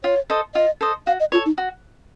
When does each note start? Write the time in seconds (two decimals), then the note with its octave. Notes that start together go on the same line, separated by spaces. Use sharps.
0.04 F4 C#5
0.30 A4 C5 D#5
0.55 F4 D#5
0.81 A4 C5 D#5
1.07 F#4 F5
1.20 D#5
1.32 F4 A4 C#5
1.46 D#4
1.58 F#4